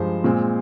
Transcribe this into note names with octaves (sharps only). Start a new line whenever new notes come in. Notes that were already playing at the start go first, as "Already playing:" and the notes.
Already playing: G2 F3 G#3 C5
A#2 G#3 C4